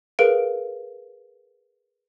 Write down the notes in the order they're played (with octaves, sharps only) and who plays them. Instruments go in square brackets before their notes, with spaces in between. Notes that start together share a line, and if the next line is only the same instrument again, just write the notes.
[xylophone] G#4 A#4 B4 F5 D7